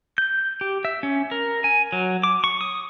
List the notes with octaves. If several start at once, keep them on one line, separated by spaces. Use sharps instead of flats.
G6
G4
E5
C#4
A#4
G#5
F#3
D6
C#6
D#6